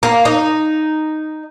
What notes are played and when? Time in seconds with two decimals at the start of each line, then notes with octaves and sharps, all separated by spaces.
0.03 A#3
0.25 D#4